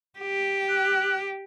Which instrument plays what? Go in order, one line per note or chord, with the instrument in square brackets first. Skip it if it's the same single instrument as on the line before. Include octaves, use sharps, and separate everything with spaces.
[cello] G4
[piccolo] F#6